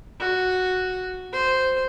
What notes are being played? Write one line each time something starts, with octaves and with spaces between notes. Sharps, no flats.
F#4
C5